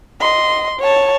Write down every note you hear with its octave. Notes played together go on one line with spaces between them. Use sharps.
D#5 C6
C#5 A5